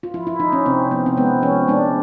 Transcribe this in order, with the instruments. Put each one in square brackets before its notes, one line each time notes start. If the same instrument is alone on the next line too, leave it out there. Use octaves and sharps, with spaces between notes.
[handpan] F4
F3 E4
E4
F3 D#4
C#4
C3 C4
F3 B3
C4
G#3 B3
F3 C#4
G#3 D4